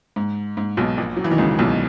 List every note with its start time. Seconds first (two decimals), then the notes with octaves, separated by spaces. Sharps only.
0.16 G#2
0.57 G#2
0.77 B1 B2
0.98 A#1 A#2
1.17 F#3
1.24 E3
1.31 D#3
1.38 C#2 C#3
1.58 B1 B2